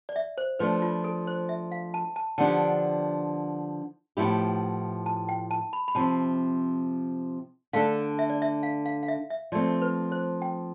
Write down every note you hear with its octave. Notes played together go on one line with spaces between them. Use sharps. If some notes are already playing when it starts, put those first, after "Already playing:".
D5
E5
C5
F3 A3 D4 B4
F4
A4
C5
E5
F5
A5
A5
D3 F3 B3 D4 G4 A5
A2 F3 B3 E4 G4 B5
A5
G5
A5
B5
B5
C3 F3 C4 A5
D3 A3 D4 A4 F5
E5
D5
E5
F5
F5
F5
E5
E5
F3 A3 C4 D5
B4
C5
G5